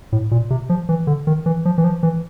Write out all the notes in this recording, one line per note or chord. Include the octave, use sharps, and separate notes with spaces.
A2
A#2
C3
F3
E3
D3
D#3
E3
F3
E3
F3
E3